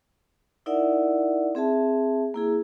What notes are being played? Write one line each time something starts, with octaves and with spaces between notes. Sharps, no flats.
D#4 E4 A#4 D5 E5 F#5
C4 G#4 E5 A5
A#3 E4 G#4